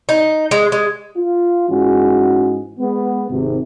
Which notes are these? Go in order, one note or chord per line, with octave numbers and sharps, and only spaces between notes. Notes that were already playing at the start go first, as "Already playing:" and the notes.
D#4
G#3
G#3
F4
G#2 E3 G#3 C#4 F#4
G#3 B3
G#1 C3